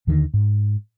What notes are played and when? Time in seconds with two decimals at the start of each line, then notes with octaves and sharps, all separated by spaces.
0.07 D#2 D3 D#3
0.34 G#2